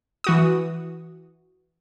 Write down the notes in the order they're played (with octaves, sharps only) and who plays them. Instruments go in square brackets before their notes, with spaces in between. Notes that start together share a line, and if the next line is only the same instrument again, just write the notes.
[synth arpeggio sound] E3 F#4 D#6